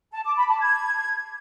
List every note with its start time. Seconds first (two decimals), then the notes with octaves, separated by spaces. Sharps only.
0.13 A5
0.25 D6
0.36 B5
0.48 A5
0.60 G#6